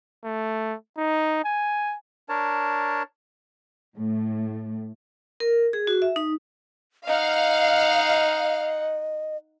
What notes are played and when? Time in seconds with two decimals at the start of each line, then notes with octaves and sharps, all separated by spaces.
0.24 A3
0.97 D#4
1.45 G#5
2.29 D4 A#4 C#5 A5
3.96 A2
5.40 A#4
5.73 G#4
5.87 F#4
6.02 E5
6.16 D#4
7.07 D#4 D#5 F5 F#5